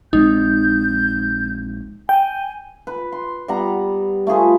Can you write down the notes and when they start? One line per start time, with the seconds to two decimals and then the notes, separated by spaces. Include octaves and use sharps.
0.13 A#1 G#3 C4 D#4 G6
2.09 G5 G#5
2.87 B4
3.12 C6
3.48 G3 B3 F#5 A#5
4.27 A3 F4 G#4 B4